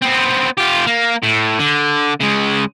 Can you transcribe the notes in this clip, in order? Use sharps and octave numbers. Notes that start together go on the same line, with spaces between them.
B3 C4
F4 G4
A#3
A2
D3
C#3 G#3